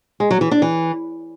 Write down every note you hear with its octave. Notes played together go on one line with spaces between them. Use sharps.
G#3
F#3
E3
D4
E3